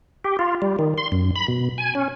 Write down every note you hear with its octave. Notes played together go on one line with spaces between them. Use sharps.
G4
F4
G3
D#3
C6
F#2
B5
B2
G#5
C#4